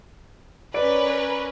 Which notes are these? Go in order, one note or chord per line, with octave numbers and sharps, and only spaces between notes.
C#4 A#4 B4 D5 D7